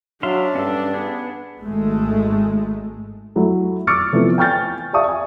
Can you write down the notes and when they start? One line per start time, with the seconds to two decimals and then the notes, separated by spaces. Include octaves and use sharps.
0.23 F#3 D4 E5 F5 C6
0.55 G2 C#4 A4
0.94 B3 G#4
1.63 G#1 G#3 A3
3.36 F#3 A3 E4
3.87 C#6 D6 E6 F6 A6 C#7
4.12 C3 E3 F3 A3 B3
4.38 G5 G#5 C#6 F6 G6 A6
4.93 D5 E5 F5 A5 C#6 D#6
5.09 G#5